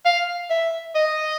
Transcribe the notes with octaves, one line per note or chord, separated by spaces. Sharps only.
F5
E5
D#5